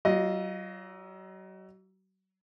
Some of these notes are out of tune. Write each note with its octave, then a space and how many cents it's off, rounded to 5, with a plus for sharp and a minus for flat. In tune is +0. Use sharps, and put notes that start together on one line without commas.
F#3 +35 F4 +0 D#5 +0